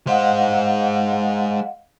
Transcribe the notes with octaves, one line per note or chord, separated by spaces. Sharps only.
G#3 C5 D#5 F5 F#5